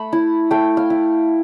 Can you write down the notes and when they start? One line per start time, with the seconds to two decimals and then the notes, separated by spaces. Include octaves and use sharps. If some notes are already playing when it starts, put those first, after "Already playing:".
Already playing: A3 A5 B5
0.13 E4
0.51 A3 G5
0.77 F5
0.90 E4